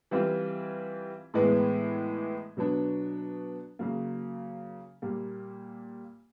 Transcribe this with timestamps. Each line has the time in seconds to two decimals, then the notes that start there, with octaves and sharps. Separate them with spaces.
0.11 E3 G3 C4 F4
1.34 A2 E3 G#3 B3
2.57 B2 F#3 B3 D4
3.79 C#3 F#3 A#3
5.02 A#2 G3 A#3